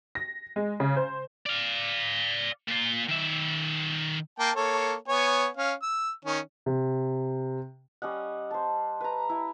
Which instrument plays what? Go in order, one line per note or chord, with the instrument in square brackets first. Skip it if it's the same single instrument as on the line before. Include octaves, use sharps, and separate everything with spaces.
[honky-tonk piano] A#6
G#3
C#3
C5
[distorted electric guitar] D5 F5
A#2 F4
D#3 E5
[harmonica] A#3 G5 A5
A#3 A4 C#5
B3 C#5 G#5
C#4 F5
E6
D#3 C#4
[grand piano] C3
[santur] G3 C#4 D#5 F#5
C5 A5
B4 A#5
E4